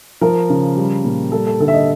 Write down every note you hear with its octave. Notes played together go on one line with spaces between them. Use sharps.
F3 A#4
C#3
G3
A#2
G3 A4
A4
D3 A4
E5
D#5